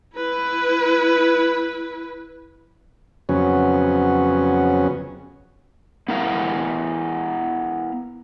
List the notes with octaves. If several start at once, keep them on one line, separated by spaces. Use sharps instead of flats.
E4 B4
F2 C#3 F#3 B3 C#4
B3 E4 A#4 F5